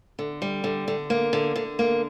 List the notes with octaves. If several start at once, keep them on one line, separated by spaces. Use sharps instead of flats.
D3
G3
D3
D3
A#3
D3
D3
A#3